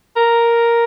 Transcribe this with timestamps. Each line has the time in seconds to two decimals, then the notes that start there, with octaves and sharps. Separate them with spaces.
0.16 A#4